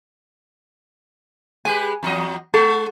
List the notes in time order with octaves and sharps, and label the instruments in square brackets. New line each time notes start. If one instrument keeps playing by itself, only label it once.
[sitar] G#3 G4 B4 [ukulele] G#5
[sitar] E2 F#3 D#5
[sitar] G#3 [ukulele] A4